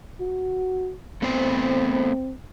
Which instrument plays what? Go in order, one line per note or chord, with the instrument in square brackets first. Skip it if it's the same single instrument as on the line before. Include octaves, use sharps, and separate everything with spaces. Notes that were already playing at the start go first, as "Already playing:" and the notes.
[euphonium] F#4
[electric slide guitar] A3 B3 C5 [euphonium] C4